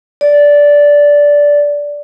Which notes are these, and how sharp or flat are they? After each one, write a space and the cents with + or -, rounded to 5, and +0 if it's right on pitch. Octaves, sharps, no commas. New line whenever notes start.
D5 -10